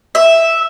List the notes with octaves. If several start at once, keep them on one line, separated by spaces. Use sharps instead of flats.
E5